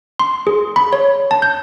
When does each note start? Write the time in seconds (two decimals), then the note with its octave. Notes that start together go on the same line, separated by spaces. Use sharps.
0.19 C6
0.47 G#4
0.76 B5
0.93 C#5
1.31 A5
1.42 G6